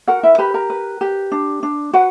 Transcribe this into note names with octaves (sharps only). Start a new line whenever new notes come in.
F#4 A#4 F#5
E4 E5
G4 B4 B5
A#4 A#5
B4
G4
D4
D4
F#4 B4 F#5